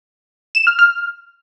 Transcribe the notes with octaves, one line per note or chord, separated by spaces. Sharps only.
E7
F6
F6